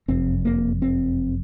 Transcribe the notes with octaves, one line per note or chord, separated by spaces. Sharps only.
F#1 F2 C3 C4
A#3
C4